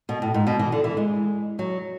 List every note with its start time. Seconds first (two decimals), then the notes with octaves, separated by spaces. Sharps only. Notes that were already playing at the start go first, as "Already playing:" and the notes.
0.09 B2
0.22 A2
0.34 G#2
0.47 B2
0.59 E3
0.72 D3
0.84 E3
0.97 G#3
1.59 F#3